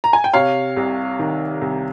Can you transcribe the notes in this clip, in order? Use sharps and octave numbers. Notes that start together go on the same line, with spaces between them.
A#5
G#5
G5
C3 C#5 F5
C2
D#3
C2